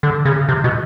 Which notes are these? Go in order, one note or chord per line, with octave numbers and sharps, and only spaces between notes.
D3
C#3
C3
B2